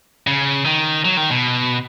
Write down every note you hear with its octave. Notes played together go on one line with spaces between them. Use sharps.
C#3
D#3
F#3
D#3
B2